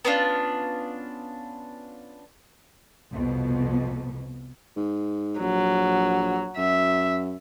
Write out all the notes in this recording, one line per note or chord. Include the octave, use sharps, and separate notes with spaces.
B3 C#4 D4 F4
C2 F2 B2
G#2
A#1 F#3
F#2 E5